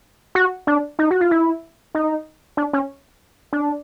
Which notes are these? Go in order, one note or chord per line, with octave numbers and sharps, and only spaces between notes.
F#4
D4
D#4
F#4
F4
E4
D#4
D4
C#4
D4